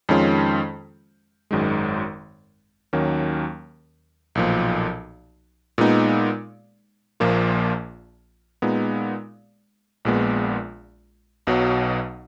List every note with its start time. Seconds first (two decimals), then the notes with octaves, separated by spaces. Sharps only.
0.09 F2 D#3 G#3 C#4 F4
1.51 G#1 F#2 D#3 G#3
2.93 D#2 D#3 F#3 A#3 C#4
4.35 B1 A#2 F3
5.78 A#2 G#3 B3 D#4
7.20 A#1 A#2 F3 A#3 F4
8.62 A#2 G#3 B3 D#4
10.05 A#1 A#2 G#3 B3
11.47 B1 B2 F#3